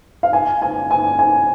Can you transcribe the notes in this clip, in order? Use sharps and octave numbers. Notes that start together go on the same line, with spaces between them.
F5
G#5
G#5
G#5
G#5